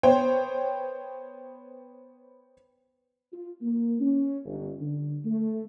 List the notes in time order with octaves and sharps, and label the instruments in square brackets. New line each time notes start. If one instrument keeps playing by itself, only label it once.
[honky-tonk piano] B3 C5 C#5 G5
[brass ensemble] F4
A#3
C#4
G1
D3
A3